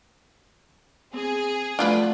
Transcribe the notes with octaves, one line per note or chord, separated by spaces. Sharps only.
C4 G#4
F3 F#3 A3 D4 F4 B4